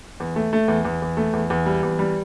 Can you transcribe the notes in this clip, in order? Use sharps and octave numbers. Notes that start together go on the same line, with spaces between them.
E2
A3
A3
E2
E2
E2
A3
E2
E2
G3
E2
G3